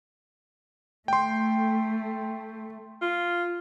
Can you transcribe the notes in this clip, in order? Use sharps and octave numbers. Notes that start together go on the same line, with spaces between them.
A3 G5 C6
F4